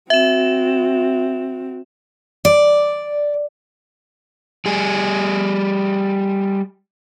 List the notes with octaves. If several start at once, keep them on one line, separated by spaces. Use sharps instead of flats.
C4 F#4 E5 E7
D5
G3 G#4